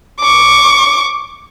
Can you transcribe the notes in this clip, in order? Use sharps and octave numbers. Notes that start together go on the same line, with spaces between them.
C#6 D6